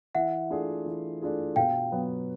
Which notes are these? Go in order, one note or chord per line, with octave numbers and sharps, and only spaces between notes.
E3 E5 F#5
A3 D4 F4 G#4
E3
A3 D4 F4 G#4
B2 F5 G5
F#3 B3